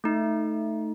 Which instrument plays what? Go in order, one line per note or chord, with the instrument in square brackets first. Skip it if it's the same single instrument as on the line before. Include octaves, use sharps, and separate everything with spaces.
[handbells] A3 D#4